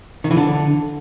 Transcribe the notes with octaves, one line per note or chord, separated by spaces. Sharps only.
D#3
E3
D3